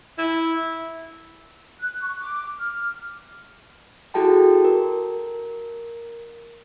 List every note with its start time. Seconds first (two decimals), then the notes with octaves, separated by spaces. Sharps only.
0.18 E4
1.81 F#6
2.01 C#6
2.19 D6
2.59 F6
4.14 E4 F#4 G#4 A4 G5 A5
4.65 A#4